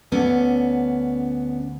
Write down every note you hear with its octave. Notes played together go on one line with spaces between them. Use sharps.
D2 D3 B3 C#4